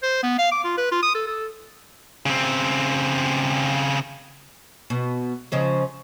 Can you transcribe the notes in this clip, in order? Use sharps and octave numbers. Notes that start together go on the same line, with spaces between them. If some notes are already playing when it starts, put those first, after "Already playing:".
C5
B3
F5
D6
F4
B4
F4
D#6
A4
A4
C#3 C4
B2
C#3 F3 G#3